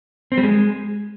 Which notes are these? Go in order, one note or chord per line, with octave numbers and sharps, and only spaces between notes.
C4
G3
G#3